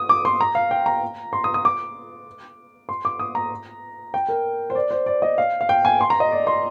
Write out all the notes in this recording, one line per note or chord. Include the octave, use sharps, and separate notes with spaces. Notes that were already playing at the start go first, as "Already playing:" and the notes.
Already playing: D#6
D6
C6
A#5
F5
G5
A#5
C6
D#6
D#6
D6
C6
D6
D#6
A#5
G5
A#4
C5
D5
C5
D5
D#5
F5
F5
G5
G#5
C6
A#5
D#5
D5
C6